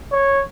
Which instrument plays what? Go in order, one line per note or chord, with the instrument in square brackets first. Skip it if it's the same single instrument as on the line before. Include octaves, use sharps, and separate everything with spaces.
[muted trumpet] C#5